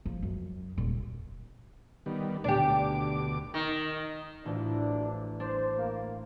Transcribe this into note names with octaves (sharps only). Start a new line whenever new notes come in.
F3
F#2
D#1
D#3 G3 B3
D2 B2 D4 G4 D6
D#3
A1 F3 F#3 D4
D4 C5
A#3